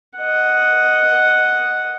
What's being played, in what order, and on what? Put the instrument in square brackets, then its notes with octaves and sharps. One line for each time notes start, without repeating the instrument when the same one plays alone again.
[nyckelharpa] D#5 F#5